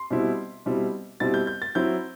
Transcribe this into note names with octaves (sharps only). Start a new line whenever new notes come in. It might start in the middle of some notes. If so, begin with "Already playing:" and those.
Already playing: C6
B2 G3 C4 E4
B2 G3 C4 E4
B2 G3 C4 E4 A6
G6
G6
A6
F#3 C4 E4 G6